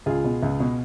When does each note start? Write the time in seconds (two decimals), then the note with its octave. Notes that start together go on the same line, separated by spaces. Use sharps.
0.06 C#2 F4 G#4
0.24 B2
0.43 C#2
0.60 B2